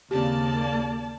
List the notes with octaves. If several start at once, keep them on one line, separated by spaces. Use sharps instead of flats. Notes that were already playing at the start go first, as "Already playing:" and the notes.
D#2 C#3 A#3 C4 G4 D5 A5